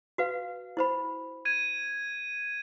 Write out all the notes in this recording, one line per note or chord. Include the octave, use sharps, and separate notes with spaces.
F#4 B4 F5
E4 C5 B5
G#6 D#7